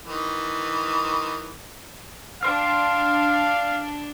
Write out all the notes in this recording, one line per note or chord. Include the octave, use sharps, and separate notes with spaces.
D#3 E3
D4 F5 G5 C6 F6